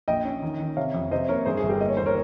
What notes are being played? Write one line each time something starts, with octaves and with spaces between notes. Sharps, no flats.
A#1 D#5 G5
C#4
D#3
D#3
C3 C#5 F5
F2
C3 C5 D#5
A#3 A#4 C#5
G2 G#4 C5
G#4
G1
G4 A#4
A#3 D#5
C#5
D#2 C5
A#4 C#5